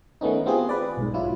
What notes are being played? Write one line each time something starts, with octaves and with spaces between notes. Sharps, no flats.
D#3 A3 B3 C#4 D#4
B3 C4 F4 G4 G#4
B4 D5
B1 G#2
F#3 E4 F4